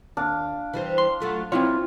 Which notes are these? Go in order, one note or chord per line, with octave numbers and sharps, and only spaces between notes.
D#2 D4 F5
E3 G3 C5
C6
F#3 A3 F4
F3 C4 E4 F4 C#5